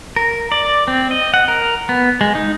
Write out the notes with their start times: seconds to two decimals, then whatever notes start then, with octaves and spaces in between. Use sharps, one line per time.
0.16 A#4
0.52 D5
0.88 C4
1.11 D#5
1.34 F#5
1.48 A#4
1.89 B3
2.21 G#3
2.35 D#4